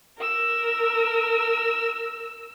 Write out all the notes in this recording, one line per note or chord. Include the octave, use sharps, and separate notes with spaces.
A#4 E6